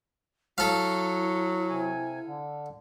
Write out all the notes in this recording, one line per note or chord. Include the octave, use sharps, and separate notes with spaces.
F#3 E4 A4 F5
C3 G#5
D3